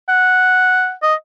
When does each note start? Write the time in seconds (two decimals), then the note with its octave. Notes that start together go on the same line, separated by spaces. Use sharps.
0.09 F#5
1.03 D#5